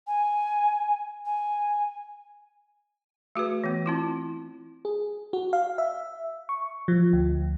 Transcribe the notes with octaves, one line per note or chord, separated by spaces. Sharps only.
G#5
G#5
A3 F#4 G#4 B4
E3 B3
C4 E4 F4
G#4
F#4
F5
E5
C#6
F3
D2